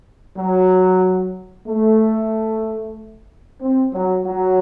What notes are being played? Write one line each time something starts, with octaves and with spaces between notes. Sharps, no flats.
F#3
A3
C4
F#3
F#3